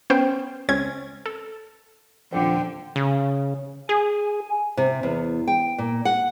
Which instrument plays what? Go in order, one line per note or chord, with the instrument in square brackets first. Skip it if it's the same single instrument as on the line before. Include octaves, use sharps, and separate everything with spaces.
[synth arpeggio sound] B3 C#4 C5 G5
C#2 C4 C#4 G#6
A4
[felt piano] D#1 F2 C5 [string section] D3 [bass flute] F3 [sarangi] G5
[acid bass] C#3
[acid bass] G#4 [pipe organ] G#5
[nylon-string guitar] C3
E2
G5
A#2
F#5